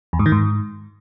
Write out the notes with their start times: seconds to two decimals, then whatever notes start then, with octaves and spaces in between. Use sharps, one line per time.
0.13 E2
0.19 G#2
0.26 D#3
0.32 G#2